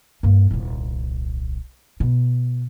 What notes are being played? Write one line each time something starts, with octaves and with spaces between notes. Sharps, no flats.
G2 A#3
D#1 C2
B2